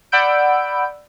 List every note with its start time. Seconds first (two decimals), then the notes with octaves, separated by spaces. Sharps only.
0.12 D5 F#5 B5 E6 G6 D7